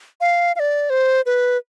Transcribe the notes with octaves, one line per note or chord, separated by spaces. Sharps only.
F5
F5
D5
C5
B4